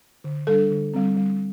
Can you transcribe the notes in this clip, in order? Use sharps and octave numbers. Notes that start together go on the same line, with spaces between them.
D3
G3 D4 A4
D3
G3 C4
G3